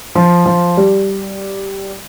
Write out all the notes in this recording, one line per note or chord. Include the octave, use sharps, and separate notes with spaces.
F3
F3
G3